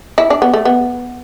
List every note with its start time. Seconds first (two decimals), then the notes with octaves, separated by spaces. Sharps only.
0.18 E4
0.30 D4
0.42 B3
0.54 A3
0.65 B3